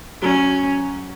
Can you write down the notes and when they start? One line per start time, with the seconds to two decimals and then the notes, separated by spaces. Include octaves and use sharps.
0.22 F#3 C#4